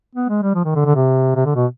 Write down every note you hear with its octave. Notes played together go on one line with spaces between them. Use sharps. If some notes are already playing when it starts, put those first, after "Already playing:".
B3
G#3
G3
F3
D#3
D3
D3
C3
C3
D3
B2